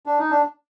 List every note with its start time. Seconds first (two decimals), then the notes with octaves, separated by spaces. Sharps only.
0.06 D4
0.19 D#4
0.30 D4